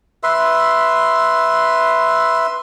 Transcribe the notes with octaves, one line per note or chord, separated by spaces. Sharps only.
B4 E5 C6